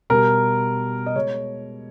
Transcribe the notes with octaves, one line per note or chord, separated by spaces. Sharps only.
B2 G3 A#4
D#5
B2 G#3 C#5